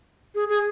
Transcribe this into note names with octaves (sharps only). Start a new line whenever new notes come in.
G#4
G#4